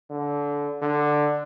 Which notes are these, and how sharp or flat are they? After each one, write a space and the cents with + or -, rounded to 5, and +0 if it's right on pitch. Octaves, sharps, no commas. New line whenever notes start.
D3 -20
D3 +10